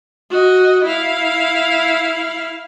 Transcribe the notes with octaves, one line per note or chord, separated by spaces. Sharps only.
F#4 D#5
E4 F5